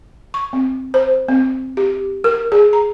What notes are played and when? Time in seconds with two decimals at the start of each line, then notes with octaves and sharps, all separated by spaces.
0.34 C#6
0.53 C4
0.94 C5
1.28 C4
1.77 G4
2.24 A#4
2.52 G#4
2.73 A#5